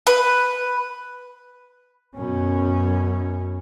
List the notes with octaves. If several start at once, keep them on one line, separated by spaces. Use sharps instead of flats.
B4
F#2 B2 C#4